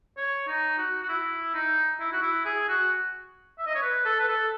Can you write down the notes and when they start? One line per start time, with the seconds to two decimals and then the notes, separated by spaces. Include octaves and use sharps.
0.18 C#5
0.48 D#4
0.78 F#4
1.03 F#4
1.09 E4
1.54 D#4
2.00 E4
2.13 F#4
2.22 E4
2.45 G#4
2.68 F#4
3.59 E5
3.66 D#5
3.75 C#5
3.82 B4
4.05 A4
4.20 B4
4.28 A4